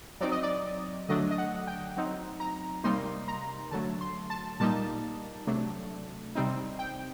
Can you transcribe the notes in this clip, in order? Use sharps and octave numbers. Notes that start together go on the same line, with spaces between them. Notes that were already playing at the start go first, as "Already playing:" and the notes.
F#3 C4 D#4 D5
D#5
D5
D3 F#3 A3 D4 D#5
D#5
F#5
G5
F#3 C4 D#4
A#5
C3 G3 A#3 D#4 C6
A#5
D3 F#3 A3 A5
C6
A5
A#2 G3 A#3 D#4 A5
C3 F#3 A3 D4
C3 G3 C4 D#4
G5